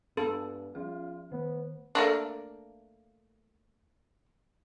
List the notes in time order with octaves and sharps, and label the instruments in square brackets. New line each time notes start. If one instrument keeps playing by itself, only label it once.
[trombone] G2 [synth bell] G#3 B3 [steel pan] A4
[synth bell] F3 G3 G#4 [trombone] F4
[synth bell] D#3 [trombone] B3
[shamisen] A3 A#3 D4